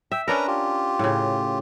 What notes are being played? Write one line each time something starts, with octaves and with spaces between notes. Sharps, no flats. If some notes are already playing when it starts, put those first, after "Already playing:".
E5 G5
C#4 D4 A#4 B4 A#5
F4 G4
A2 C#3